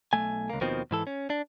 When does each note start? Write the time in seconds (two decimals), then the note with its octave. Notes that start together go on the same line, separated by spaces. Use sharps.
0.13 B1 A3 G#5
0.50 C#2 A#3
0.61 D#2 B2 D#3 F3 C4
0.91 G#2 E3 A4
1.07 C#4
1.30 D4